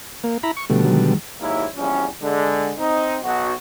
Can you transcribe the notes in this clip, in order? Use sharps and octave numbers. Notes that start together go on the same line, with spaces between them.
A#3
E4 A#5 B5
C#6
B2 D3 F3 G3 A3
D#3 F#3 G#3
D#2 G#2 F#3 A#3 E4
A#1 E2 G3 C#4
D3 G#3
C4 D#4
B1 F#4